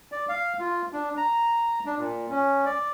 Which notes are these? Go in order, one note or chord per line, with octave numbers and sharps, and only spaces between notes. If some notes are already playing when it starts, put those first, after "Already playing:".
D5
F5
F4
D4
A#5
D4
A#2
C#4
D5